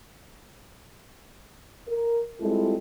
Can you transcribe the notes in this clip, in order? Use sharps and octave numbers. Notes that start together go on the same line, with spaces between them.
A#4
G3 G#3 C4 E4 F4 A4